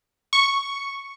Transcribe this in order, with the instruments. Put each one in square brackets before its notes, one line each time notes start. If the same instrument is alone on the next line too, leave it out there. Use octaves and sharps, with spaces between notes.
[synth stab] C#6